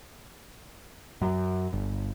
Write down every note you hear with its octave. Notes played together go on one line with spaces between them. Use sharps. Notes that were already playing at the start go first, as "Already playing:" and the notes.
F#2
G1